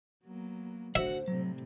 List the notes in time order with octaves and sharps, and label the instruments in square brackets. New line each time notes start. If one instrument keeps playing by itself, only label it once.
[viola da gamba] F#3 A#3 B3
[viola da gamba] A2 D3 [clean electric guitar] F#4 F#5 [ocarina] C5 [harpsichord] E5
[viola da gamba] A2 C3 G3 [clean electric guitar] F#3